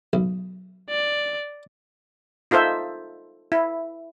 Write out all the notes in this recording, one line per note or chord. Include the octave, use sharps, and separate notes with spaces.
B1
D5
D#4 F4 A4 C5 E5
E4